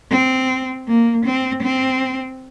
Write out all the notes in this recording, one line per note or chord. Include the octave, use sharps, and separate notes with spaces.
C4
A#3
C4
C4